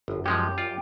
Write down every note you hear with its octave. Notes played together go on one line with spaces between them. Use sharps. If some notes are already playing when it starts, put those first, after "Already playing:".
G1 F#2
F3 G#3 C#4 G4
F4 D5